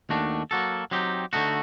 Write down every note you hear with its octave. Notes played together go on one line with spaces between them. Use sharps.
D#2 D#3 A3 D4 F#4
F#3 A#3 F#4 A4
F#3 C4 D#4 G4
D3 A3 D#4 F#4